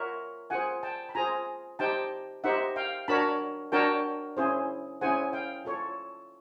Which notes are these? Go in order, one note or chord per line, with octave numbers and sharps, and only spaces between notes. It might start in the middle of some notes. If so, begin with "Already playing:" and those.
Already playing: F4 A#4 C#5 E5 F#5
F4 G#4 C5 F#5 G#5
G5 A5
B5
F4 G#4 C5 G#5 A#5
D#4 G4 C5 G5 A5
D#4 G4 C5 E5 F#5
F5 G5
D4 F#4 A#4 C#5 A5 B5
D4 F#4 A#4 C#5 G5 A5
C#4 E4 G#4 C5
C#4 E4 G#4 C5 F#5 G#5
F5 G5
F4 A4 C#5